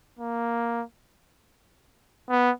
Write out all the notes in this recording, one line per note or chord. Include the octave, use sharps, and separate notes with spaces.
A#3
B3